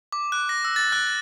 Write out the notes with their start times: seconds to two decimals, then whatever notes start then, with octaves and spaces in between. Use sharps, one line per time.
0.12 D6
0.32 F#6
0.49 A#6
0.65 E6
0.76 A6
0.92 F#6
1.07 A6